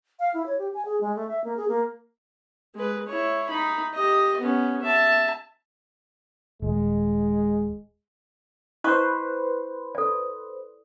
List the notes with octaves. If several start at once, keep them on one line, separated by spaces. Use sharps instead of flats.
F5
E4
C#5
G4
G#5
G#4
G#3
A3
E5
A#3
G#4
A#3
G#3 B4
E4 C#5
D#4 B5
G4 D#5
B3 C#4
E5 A5
D#1 G#3
E4 B4 C5 D#5 C#6
A4 D5